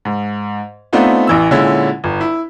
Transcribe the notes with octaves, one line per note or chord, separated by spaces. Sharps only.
G#2
A3 B3 C4 D4 D#4 F4
A1 E3 E6
A#2 D3 G#3 C#4 E4
G1
E4